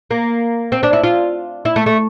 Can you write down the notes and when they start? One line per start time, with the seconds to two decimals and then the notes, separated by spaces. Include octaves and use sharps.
0.11 A#3
0.72 C4
0.83 D4
0.93 E4
1.04 F4
1.65 E4
1.76 A3
1.86 A3